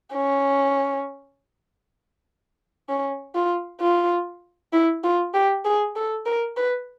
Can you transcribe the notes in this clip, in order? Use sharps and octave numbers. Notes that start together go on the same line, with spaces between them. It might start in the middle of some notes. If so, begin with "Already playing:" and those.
C#4
C#4
F4
F4
E4
F4
G4
G#4
A4
A#4
B4